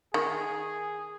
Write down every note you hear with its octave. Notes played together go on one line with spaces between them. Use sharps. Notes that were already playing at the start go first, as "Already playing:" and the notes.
D#3 G#4